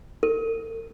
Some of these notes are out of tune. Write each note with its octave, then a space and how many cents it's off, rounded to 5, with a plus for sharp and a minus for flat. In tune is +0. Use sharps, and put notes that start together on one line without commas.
A4 +45